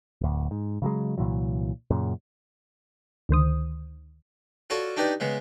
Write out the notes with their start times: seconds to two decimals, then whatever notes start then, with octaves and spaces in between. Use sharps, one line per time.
0.21 D1 D2
0.51 G#2
0.82 C#3 F#3 G#3
1.18 C2 A#2 E3 F#3
1.91 F#2 A#2 C#3
3.29 D2 D#3 C5 D#6
4.70 F4 F#4 A4 C#5 D5
4.97 D4 D#4 G4 B4 D5
5.20 C#3 G#3 B3